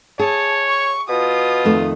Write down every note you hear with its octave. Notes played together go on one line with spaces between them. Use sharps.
G#4 C#5 E5 A5
C#6
B2 F4 D#6
F2 D#3 A3